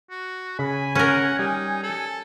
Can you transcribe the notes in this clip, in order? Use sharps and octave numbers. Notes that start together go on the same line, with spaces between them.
F#4
C#3 G#5 B5
C#4 A#4 F#5
G3 D#4
A4